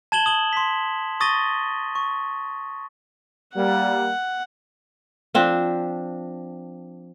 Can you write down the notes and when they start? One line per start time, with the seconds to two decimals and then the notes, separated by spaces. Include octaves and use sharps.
0.12 A5 G#6 E7 F#7 G7
0.26 D#6 F#7 G7
0.53 C6 B6
1.20 C#6 D#6 A6 A#6 D#7 G7
1.95 C#6
3.55 G3 A#3 F#5
5.35 F3 C4 D4